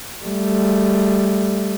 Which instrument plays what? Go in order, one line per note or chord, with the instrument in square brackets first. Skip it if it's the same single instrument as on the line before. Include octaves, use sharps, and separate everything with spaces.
[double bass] G3 A3